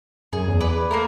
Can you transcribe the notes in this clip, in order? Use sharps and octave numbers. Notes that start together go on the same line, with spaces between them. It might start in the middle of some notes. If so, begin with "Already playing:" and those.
F#2 G#4
E2
B4 D5
A3 A#3 F4 A#4